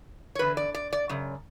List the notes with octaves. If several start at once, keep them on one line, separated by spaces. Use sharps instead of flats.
C#5
E2 D3 B4
D5
D5
D5
F#2 C#3